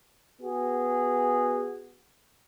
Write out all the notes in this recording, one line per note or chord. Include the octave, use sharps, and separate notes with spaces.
B3 F#4 G#4